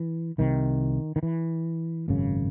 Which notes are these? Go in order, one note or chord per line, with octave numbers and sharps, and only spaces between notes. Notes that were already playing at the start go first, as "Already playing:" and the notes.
Already playing: E3
C2 C3 D#3
D#3
E3
G#1 F#2 C#3